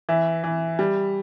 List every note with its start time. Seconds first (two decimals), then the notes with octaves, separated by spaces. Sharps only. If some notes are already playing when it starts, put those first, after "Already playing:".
0.09 E3 E5
0.44 E3
0.79 G3